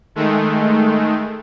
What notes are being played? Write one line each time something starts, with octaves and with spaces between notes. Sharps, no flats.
D#3 G#3 A3